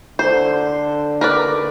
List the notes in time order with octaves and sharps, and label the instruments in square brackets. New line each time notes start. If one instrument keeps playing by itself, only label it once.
[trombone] D3 [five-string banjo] C5
[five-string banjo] A#4 B4 D5